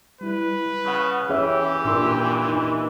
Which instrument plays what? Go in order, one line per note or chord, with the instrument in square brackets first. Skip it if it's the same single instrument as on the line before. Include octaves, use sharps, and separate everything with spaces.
[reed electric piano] G3 E4 [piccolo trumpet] B4
[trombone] C#3 [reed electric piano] F#5 B5 F#6
[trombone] E3 [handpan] C#4 E5 [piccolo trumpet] G4 [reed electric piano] G#4 C#5
[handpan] A#2 D4 F4 [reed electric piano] A#4 C6 E6
[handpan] D#4